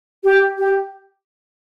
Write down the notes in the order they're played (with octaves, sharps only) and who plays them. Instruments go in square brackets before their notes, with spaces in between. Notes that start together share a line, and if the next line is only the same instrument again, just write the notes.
[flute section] G4
G4